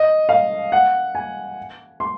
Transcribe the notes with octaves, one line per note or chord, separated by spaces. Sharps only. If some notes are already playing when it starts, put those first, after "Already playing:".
Already playing: D#5
F5
F#5
G#5
C6